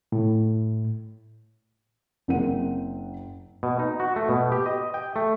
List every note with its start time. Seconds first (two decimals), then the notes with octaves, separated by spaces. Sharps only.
0.12 A2
2.28 F#1 C#3 C4 A#4 F#5 D#7
3.63 B2
3.79 D#4
4.00 F#4
4.16 A3
4.29 B2
4.52 G4
4.66 D#5
4.94 G5
5.16 A3